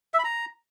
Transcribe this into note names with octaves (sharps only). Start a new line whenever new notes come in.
E5
B5
A#5